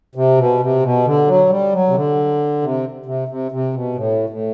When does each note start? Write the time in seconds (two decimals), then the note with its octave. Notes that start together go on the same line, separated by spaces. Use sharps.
0.15 C3
0.38 B2
0.60 C3
0.83 B2
1.05 D3
1.27 F#3
1.50 G3
1.73 F#3
1.88 C3
1.95 D3
2.62 C3
3.06 C3
3.28 C3
3.52 C3
3.73 B2
3.96 A2
4.30 A2